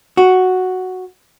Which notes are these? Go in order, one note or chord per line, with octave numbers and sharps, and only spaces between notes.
F#4